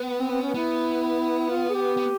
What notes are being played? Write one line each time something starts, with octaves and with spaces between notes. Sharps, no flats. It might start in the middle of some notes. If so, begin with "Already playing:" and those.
Already playing: B3
C4
C4
C#4
B3 E4
F4
G#4
G4
B3